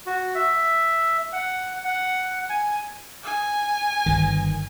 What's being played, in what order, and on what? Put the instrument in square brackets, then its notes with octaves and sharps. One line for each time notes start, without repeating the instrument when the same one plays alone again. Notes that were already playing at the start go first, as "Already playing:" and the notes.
[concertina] F#4
E5
F#5
F#5
G#5
[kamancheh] G#5
[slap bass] G1 D#3